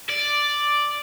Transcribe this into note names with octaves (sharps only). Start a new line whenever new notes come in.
D5